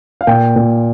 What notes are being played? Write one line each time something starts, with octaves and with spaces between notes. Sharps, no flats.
F5
A#2 G5
A#2